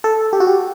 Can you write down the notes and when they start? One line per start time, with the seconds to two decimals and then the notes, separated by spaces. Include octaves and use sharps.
0.04 A4
0.33 G4
0.40 F#4
0.47 G4